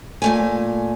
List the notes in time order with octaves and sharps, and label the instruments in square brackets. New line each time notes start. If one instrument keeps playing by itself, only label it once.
[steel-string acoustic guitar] A#2 A3 G#5